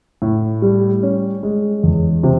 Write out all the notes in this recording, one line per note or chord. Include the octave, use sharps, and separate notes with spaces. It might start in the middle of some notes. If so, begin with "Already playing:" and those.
A2
G3
C#4
G#3
E2
C3